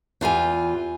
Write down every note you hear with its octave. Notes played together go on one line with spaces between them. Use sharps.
E2 F4 G4 G#5